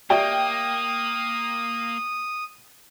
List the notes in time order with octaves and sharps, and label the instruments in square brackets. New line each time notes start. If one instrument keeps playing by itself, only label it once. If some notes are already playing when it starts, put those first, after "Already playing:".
[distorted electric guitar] A#3 [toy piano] G4 D5 E5 [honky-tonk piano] G5 [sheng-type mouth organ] D#6